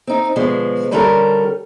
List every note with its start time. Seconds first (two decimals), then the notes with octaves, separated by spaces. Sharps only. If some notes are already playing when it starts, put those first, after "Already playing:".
0.07 C4 D#4
0.36 B2 D3 F3 G#3
0.91 D3 G3 C#4 G4 A4 A#4